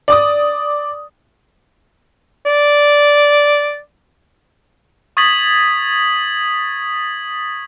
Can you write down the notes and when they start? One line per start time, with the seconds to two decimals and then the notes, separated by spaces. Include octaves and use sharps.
0.08 D5 D6 D#6
2.46 D5
5.17 C#6 D#6 G#6 A6 B6 F#7